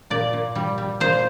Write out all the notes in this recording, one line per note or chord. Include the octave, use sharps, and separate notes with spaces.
A#2 D5
A#2
G3
G3
A#2 C5